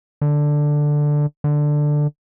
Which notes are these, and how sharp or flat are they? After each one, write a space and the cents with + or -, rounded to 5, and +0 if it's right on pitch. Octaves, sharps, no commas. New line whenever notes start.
D3 +5
D3 +10